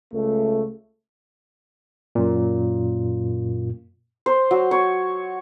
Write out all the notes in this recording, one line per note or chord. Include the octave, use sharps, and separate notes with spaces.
C#2 A3
F#2 A#2
C5
F#3
C#5